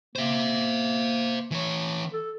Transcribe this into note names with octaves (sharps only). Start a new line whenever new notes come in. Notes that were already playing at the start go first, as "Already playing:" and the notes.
A#3 C5 E5
E3 C#5
A4